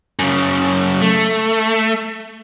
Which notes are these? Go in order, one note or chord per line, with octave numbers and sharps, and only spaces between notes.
F#2 C#3
A3